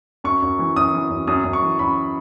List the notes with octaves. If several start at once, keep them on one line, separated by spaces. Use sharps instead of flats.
F#2 C#6
F#2
E3
F#2 D#6
E3
F#2
F#2 D#6
F#2
C#6
E3
F#2 B5